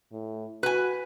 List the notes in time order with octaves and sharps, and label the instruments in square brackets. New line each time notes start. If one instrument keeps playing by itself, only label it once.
[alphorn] A2
[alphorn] F#4 [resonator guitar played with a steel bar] B4 G#5